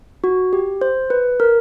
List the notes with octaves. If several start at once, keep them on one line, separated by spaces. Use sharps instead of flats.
F#4
G4
C5
B4
A#4